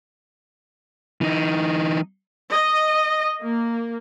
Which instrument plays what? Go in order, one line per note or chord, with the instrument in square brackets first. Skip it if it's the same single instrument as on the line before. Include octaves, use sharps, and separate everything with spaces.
[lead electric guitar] E3 D#4
[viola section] D#5
A#3